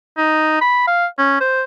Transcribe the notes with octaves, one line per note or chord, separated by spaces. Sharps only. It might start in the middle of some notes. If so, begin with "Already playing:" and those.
D#4
B5
F5
C#4
C5